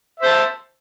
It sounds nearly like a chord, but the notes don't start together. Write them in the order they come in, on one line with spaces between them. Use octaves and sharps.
E5 C5 A5